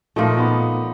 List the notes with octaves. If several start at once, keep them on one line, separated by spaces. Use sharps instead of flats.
A#2 F3 A3 D#4
B3